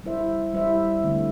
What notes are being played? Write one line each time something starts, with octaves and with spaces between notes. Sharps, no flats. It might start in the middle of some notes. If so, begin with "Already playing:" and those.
G3 E4 C5 E5
G3 E4 C5 E5
D3 A3 C4